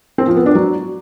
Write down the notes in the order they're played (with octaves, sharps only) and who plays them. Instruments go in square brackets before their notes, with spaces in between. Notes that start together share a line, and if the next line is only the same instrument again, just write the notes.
[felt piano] C4
F3
B3
D4
F#3